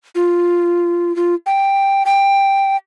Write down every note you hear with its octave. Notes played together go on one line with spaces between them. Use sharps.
F4
F4
G5
G5